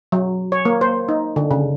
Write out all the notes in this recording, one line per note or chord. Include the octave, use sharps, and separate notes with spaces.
F#3
C#5
A#3
C5
D#4
D3
C#3